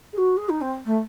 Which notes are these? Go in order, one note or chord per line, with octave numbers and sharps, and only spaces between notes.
G#4
F#4
G#4
D#4
C4
A3